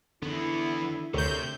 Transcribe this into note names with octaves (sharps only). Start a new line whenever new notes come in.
E2 D3 B3 E4
D2 C3 A4 A#4 C#5 G6